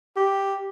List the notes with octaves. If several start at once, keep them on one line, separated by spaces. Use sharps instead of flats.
G4